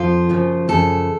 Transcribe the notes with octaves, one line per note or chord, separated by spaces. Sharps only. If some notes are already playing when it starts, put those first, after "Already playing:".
Already playing: F2 F3 F4
F#2 C#3 F3
F#2 C#3 F3 A4